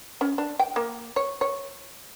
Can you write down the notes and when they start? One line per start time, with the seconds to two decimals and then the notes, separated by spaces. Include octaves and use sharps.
0.21 C#4
0.38 D4
0.59 G5
0.76 A#3
1.16 C#5
1.41 C#5